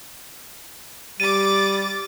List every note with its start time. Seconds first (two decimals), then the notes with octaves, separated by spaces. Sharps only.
1.20 G3 D6 A6 D#7